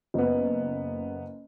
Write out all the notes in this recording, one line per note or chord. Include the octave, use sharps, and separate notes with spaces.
F#1 B3